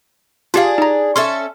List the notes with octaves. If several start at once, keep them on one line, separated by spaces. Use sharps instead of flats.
D4 F4 G4 G#4 F5
D#4 A#5
C#4 A4 E5 C6